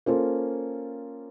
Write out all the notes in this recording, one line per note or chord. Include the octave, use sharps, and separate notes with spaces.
A#3 C#4 F4 A4 C5